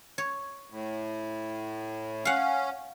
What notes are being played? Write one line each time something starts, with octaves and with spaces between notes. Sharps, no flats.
C#5
A2
C#4 F5 F#5